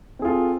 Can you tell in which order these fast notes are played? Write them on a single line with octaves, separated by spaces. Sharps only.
C4 G#4 F4 A4